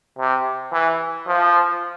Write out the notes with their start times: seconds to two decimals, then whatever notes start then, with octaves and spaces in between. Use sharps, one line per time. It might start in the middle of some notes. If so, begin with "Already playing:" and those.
0.19 C3
0.72 E3
1.27 F3